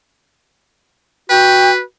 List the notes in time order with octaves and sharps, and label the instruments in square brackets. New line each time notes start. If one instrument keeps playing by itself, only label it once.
[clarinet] F#4 [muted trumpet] B4 [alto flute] G5